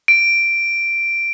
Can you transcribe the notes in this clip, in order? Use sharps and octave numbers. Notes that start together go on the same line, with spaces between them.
D7